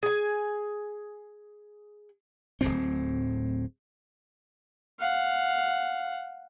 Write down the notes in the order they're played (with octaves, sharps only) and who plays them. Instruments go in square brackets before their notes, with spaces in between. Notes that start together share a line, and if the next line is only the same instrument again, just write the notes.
[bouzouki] G#4 G#5
[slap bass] D1 G1 A2 C4
[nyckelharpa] F5 F#5